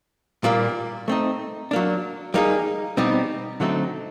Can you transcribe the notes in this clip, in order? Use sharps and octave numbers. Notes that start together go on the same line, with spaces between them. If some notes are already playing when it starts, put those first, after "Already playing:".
A#2 G3 A#3
A3 C4 D#4
F#3 A#3 D4
G3 A#3 D#4 G#4
B2 G3 C4 D#4
D3 F#3 A3 C4 D#4